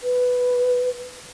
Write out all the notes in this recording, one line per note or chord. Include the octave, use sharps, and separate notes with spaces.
B4